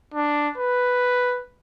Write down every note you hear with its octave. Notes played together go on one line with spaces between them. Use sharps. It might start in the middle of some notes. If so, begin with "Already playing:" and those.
D4
B4